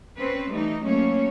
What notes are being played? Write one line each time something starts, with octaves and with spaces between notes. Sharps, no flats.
C4 C#4 B4
E3 G3 A3 D#4
F#3 A3 A#3 C#4 C#5